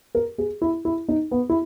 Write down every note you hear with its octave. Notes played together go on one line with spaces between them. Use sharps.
A#4
G#4
E4
E4
D#4
B3
E4